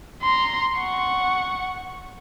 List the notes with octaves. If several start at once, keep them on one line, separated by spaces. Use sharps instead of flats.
A#5 C6
F#5 C#6